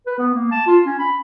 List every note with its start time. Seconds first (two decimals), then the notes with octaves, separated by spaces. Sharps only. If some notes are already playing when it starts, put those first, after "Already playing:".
0.07 B4
0.19 B3
0.35 A#3
0.52 A5
0.67 F4
0.86 C#4
0.99 B5